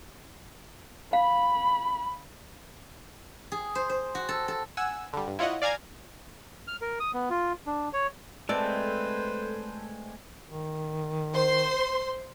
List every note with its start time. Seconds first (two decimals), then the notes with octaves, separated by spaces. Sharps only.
1.13 F5 B5
3.52 G#4
3.75 C5
3.90 C5
4.15 F#4
4.29 A4
4.48 A4
4.77 F#5 G#5 E6
5.13 D3 G3
5.27 G2
5.39 E4 F4 C#5 D#5 F#5
5.62 D5 F5 G#5 A#5 G#6
6.68 F6
6.81 A#4
7.00 D#6
7.14 B3
7.30 F4
7.67 D4
7.93 C#5
8.49 G#3 A3 C4 A4 B4 C5 D5
10.48 D#3
11.33 C5 C6